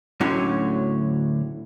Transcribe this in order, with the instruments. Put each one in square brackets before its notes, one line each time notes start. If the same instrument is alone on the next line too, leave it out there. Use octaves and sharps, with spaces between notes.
[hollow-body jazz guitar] D2 A2 D3 F#3 C#4